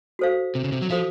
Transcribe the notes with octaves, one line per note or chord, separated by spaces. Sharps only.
F#4 A4 C5 F5
C3
C#3
C3
F#3
F3 F#4 A4 C5 F5